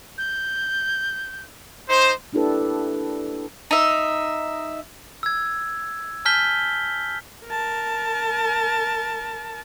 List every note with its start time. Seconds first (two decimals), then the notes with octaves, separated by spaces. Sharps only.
0.18 G6
1.88 D#4 C5
2.33 A#3 D4 E4 G4 A4 B4
3.71 D#4 E5
5.23 E6 G#6
6.25 G#5 A5 F6 G6 B6 G7
7.47 A#4 A5